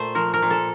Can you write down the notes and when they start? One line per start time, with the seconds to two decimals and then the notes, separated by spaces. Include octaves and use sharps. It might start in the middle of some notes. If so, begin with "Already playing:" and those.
Already playing: A#2 A3 C5
0.15 F3 A#4
0.34 A#4
0.42 A#2
0.50 A4